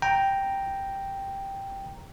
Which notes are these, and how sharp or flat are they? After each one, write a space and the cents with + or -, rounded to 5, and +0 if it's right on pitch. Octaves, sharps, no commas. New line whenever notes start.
G5 +0 A#5 +0